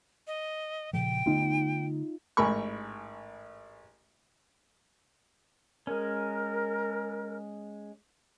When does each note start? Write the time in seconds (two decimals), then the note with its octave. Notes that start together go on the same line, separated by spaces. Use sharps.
0.27 D#5
0.93 A#2 C#3 F3 G5
1.26 D3 A3 B3 D#4 F4
2.37 A1 G#2 A#4 B5 C#6
5.87 G#3 C#4 A#4